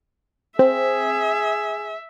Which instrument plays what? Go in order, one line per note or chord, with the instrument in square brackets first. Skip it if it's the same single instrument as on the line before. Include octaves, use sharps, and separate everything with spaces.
[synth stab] C4 [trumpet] G#4 [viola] E5